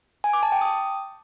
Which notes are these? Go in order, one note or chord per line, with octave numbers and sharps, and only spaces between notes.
G#5
D6
A5
G5
D#6